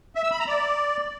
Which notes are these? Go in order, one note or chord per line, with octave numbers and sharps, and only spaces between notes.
E5
E6
B5
A#5
D5